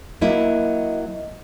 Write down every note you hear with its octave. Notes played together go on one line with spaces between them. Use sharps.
F#3 A#3 E4 D#5